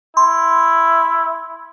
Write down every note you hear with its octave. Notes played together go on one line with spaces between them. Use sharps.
E4 C6